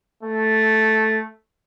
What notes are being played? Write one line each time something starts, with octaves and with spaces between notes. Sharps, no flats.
A3